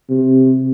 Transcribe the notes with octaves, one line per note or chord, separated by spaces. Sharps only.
C3